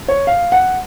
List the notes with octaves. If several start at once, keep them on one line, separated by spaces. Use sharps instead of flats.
C#5
F5
F#5